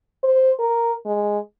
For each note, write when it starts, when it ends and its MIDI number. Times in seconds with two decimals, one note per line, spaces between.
0.23 0.52 72
0.59 0.93 70
1.06 1.39 56